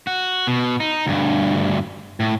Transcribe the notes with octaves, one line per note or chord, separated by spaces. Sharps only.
F#4
B2
D#4
D2 G2
A2